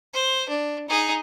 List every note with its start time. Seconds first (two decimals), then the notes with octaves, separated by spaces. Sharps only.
0.14 C5
0.49 D4
0.88 D#4 G#4